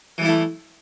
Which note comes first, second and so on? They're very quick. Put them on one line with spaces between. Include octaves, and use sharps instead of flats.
E3 G3 E4 A3